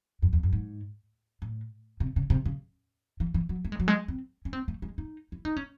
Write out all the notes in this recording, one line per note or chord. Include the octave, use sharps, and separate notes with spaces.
F#2
E2
F#2
G#2
A2
C3
C#3
C3
C#3
E3
E3
F#3
A3
G#3
F#3
G#3
C4
C#4
C4
A3
G#3
D#4
E4
D#4
C#4